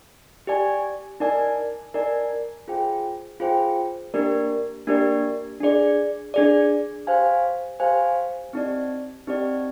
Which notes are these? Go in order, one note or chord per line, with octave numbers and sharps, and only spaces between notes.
G4 D5 G#5
D#4 A#4 D5 G#5
D#4 A#4 D5 G#5
F4 G#4 C5 G5
F4 G#4 C5 G5
A#3 D4 G4 A#4 D5
A#3 D4 G4 A#4 D5
D4 G#4 D5
D4 G#4 D5
G4 C5 F5 G#5
G4 C5 F5 G#5
C4 D#4 G4 D5
C4 D#4 G4 D5